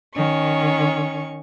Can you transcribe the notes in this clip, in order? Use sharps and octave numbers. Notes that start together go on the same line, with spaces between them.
D#3 C#4 C#6